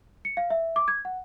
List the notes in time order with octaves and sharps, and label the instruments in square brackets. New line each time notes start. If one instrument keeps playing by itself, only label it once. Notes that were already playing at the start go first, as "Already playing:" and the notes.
[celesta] C#7
F5
E5
D6
G#6
F#5